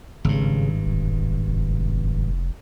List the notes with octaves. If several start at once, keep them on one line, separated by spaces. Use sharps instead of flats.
G#1 G2 C#3
E1
F1